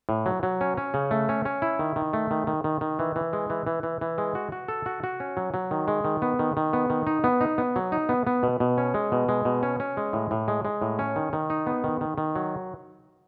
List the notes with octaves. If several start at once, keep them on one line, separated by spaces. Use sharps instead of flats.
A2
F#3
F#3
C#4
C#4
C#3
A3
C#4
C#4
E4
D#3
D#3
A3
D#3
D#3
D#3
D#3
E3
E3
G#3
E3
E3
E3
E3
G#3
F#4
F#4
A4
F#4
F#4
C#4
F#3
F#3
D#3
G#3
D#3
B3
D#3
D#3
B3
D#3
D#4
B3
D#4
B3
F#3
D#4
B3
B3
B2
B2
C#4
G#3
B2
G#3
B2
C#4
C#4
G#3
A2
A2
G#3
G#3
A2
C#4
D#3
D#3
D#4
B3
D#3
D#3
D#3
F#3